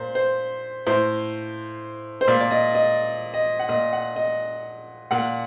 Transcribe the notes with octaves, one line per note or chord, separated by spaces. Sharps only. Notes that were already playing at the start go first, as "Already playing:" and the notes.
Already playing: A#2 C5
C5
A2 C5
C5
A#2 D5
D5
D#5
D#5
D#5
F#5
A#2 D#5
F#5
D#5
A#2 F#5